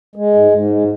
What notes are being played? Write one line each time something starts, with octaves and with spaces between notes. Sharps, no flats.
G#3
G#2
G#2
G#3